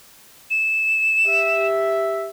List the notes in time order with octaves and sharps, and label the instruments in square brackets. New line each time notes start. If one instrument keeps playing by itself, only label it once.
[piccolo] E7
[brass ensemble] G4 E5